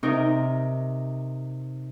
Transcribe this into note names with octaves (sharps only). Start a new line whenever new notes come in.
C3 D#4 A#4